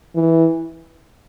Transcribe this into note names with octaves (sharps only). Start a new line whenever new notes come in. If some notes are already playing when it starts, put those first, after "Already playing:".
E3